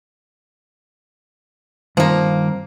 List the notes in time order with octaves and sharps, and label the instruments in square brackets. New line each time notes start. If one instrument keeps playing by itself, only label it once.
[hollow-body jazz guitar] G2 D#3 C4 [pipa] F3 A#3